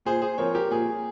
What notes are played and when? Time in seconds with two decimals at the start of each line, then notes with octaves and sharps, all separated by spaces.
0.05 A#2 G#4 C5
0.22 G#4 C5
0.38 F3 C4 A#4 C#5
0.55 G4 A#4
0.71 A#2 G#4